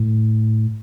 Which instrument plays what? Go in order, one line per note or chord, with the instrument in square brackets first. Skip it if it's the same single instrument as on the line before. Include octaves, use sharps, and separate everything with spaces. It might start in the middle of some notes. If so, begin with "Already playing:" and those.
Already playing: [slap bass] A2